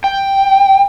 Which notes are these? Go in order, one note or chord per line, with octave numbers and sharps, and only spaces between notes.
G5